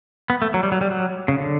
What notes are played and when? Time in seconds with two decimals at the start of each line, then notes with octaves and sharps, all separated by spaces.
0.30 B3
0.42 A3
0.54 F#3
0.63 G3
0.72 F#3
0.81 G3
0.91 F#3
1.28 C#3
1.38 D3